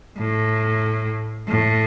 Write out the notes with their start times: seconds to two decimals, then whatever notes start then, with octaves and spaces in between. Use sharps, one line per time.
0.18 A2
1.48 A2